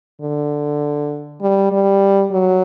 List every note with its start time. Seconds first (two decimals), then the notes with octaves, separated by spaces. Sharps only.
0.21 D3
1.41 G3
1.72 G3
2.31 F#3